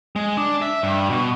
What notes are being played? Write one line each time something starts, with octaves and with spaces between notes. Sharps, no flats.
G#3
D4
E5
G2
B2